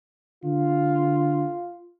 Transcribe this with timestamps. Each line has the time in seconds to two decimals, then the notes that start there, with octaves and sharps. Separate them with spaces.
0.44 D3 F4